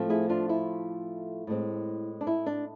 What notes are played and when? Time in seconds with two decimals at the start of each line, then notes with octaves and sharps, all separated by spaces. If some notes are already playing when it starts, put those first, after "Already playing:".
Already playing: A2 F3 A3 C4
0.09 E4 G#4
0.29 D4 F4
0.49 E4
1.47 A2 G#3 C4
2.21 D4
2.27 E4
2.46 D4